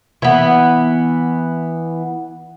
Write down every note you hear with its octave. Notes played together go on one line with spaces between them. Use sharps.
E3 B3